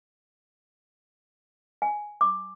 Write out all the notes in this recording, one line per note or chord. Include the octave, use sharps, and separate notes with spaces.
G#5
D6